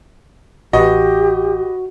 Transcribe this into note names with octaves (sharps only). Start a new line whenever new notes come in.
A1 F#4 G4 B4 D#5